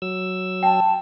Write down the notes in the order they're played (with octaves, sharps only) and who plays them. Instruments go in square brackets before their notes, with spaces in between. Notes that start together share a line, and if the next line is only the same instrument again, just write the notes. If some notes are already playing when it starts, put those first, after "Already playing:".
[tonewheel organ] F#3 E6
[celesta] G5 [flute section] A5